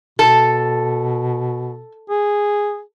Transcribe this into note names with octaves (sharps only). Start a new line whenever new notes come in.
B2 A4
G#4